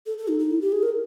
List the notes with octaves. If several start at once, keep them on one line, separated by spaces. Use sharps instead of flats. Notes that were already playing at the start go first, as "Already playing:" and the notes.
A4
A4
D#4
D#4
E4
G4
G#4
A#4